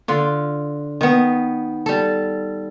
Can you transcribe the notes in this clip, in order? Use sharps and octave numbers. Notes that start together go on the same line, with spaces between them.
D3 F4
D#3 B3
G3 A4